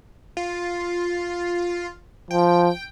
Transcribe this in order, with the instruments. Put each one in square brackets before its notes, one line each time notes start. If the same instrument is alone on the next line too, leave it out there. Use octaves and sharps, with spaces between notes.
[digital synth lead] F4
[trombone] F3 [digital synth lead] G5